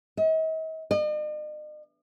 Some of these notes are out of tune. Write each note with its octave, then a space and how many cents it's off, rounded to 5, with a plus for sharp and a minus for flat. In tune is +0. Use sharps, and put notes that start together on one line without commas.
D#5 +45
D#5 -45